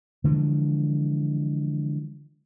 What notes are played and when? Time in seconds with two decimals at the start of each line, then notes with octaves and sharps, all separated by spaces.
0.24 D3 E3 F3 G#3